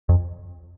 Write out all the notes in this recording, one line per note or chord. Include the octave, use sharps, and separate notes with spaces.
F2